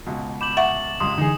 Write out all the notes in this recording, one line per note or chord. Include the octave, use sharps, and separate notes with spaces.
C#2 B2
B5 D6 G6 E7 F#7
E5 F#5 C#6 D6 A6 F#7
C#2 G2 C6 D#6
D3 E3 D#4 G#4